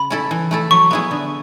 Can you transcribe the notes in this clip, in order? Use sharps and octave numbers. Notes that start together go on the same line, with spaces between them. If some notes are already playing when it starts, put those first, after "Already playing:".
Already playing: C#3 B5
C#4 E4 A4
E3
A3 E4 A4
F#3 C#6
B3 E4 G#4
D3